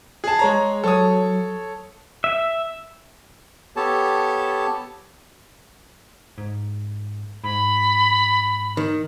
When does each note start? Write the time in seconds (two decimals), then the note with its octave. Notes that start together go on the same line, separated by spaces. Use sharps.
0.24 G#4 A5
0.39 G#3 C#5 A#5
0.84 F#3 A4 C#5 D#6
2.24 E5
3.76 B3 G4 A4 C#5 A5
6.38 G#2
7.44 G#2 B5
8.77 D#3